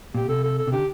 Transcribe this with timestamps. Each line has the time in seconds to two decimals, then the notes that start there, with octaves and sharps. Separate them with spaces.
0.15 A#2 G4
0.28 C3 A4
0.44 A4
0.58 A4
0.67 C3
0.72 D3 G4